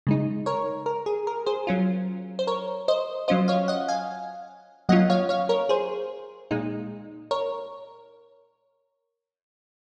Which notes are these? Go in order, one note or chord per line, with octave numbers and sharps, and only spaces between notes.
C#3 G#3 D#4
A#4 C#5
A#4
G#4
A#4
G#4 C5
F#3 C#4 F4
C5
A#4 C#5
C5 D#5
F#3 C#4 F4 C5 D#5
C#5 F5
D#5 F#5
F5 G#5
F#3 A#3 C#4 F4 D#5 F#5
C#5 F5
C#5 F5
A#4 C#5
G#4 C5
A#2 G#3 D#4
A#4 C#5